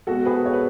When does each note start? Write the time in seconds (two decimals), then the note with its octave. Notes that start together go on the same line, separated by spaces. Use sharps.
0.07 B2 G#3 F#4 A4
0.26 G#4 B4
0.46 C#5
0.54 B4